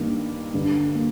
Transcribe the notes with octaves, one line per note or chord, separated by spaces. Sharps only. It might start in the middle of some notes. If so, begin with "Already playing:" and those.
Already playing: G2 D#3 A#3
G2 D3
A#3